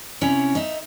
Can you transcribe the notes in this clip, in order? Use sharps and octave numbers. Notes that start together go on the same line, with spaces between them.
C3 C#4 E4 C#5
D#4 E5